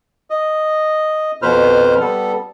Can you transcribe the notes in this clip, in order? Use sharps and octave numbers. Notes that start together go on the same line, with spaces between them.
D#5
F2 B2 B4 C5 F6
G3 B3 A4